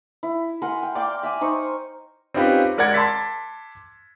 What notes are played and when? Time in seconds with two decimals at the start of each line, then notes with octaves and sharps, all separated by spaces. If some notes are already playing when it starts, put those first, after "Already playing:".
0.23 E4
0.62 A#4 F#5 G#5 C6
0.83 G5
0.95 D5 F5 G5 D6
1.23 E5 G5 G#5
1.41 D#4 C5 C#6
2.34 C4 C#4 D#4 F4 G4 B4
2.78 G#3 A#4 D5 F#5 G#6 C#7
2.94 A5 C6 D6 E6 A6 B6